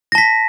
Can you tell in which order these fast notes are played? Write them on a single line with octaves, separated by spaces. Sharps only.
A#6 A5 B6